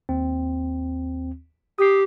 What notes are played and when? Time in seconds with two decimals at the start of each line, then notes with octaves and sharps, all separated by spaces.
0.09 D#2 C4
1.79 G4 D#6 C7